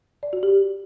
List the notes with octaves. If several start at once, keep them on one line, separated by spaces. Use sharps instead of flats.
D5
F#4
G4